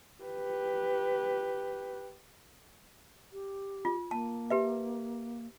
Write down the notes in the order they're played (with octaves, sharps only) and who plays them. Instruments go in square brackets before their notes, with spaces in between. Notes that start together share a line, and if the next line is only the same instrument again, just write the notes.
[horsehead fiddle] G4 B4
[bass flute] G4
[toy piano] F4
[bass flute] A#3 [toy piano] A5
[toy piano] G4 B4 E5